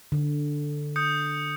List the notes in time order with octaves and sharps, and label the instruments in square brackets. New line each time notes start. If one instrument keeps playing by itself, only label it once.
[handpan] D3
[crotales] D#6 G6 C#7